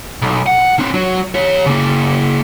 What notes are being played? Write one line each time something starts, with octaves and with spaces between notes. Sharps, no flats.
B1
F#5
C4 D4
F#3
G4 C#5
C#3 A#3